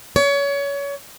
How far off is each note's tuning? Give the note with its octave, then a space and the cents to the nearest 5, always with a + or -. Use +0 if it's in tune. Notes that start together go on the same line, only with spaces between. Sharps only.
C#5 +30